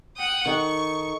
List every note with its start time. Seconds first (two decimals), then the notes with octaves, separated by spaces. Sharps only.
0.16 F#5 G5 D#6
0.46 D#3 D#4 A4 C#6